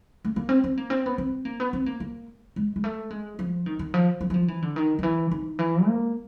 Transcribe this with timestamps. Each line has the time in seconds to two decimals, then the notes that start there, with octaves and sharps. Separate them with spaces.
0.25 A3
0.36 A#3
0.49 C4
0.64 C4
0.77 A#3
0.90 C4
1.06 B3
1.18 C4
1.45 A#3
1.60 B3
1.73 C4
1.86 A#3
2.00 A#3
2.56 G#3
2.76 G#3
2.84 A3
3.10 G#3
3.39 F3
3.66 D#3
3.79 D#3
3.94 F3
4.21 F3
4.30 F#3
4.34 F3
4.48 E3
4.62 D3
4.76 D#3
4.99 D#3
5.03 E3
5.31 D#3
5.59 E3
5.86 A#3